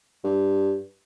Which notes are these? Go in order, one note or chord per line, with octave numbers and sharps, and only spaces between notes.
G2